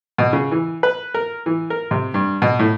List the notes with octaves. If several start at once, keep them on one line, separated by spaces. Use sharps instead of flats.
B2
C#3
E3
B4
A#4
E3
A#4
C3
G2
B2
A2